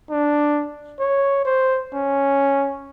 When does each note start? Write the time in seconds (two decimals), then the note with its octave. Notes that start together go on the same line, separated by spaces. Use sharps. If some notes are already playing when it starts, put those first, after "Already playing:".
0.10 D4
1.00 C#5
1.45 C5
1.94 C#4